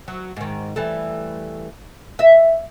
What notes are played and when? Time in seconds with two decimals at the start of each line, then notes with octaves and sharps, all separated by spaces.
0.08 F#3
0.37 G#2 D#3
0.76 E3 G3 A3
2.19 D#5 E5